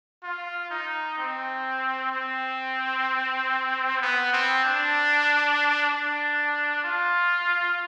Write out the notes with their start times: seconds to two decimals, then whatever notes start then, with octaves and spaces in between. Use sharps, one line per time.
0.23 F4
0.71 D#4
1.18 C4
2.12 C4
4.02 B3
4.33 C4
4.65 D4
5.90 D4
6.84 F4